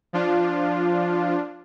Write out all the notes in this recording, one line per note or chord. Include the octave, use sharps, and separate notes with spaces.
F3 D4 F4